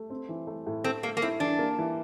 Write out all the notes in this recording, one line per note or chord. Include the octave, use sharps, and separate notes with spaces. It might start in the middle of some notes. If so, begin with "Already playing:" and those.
Already playing: A3
C4
E3
A3
A2
C4 A4
A3 A#3
A#3
C4 E4
E3 D4
A#3
E3